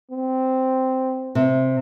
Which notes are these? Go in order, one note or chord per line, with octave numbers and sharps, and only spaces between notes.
C4
C3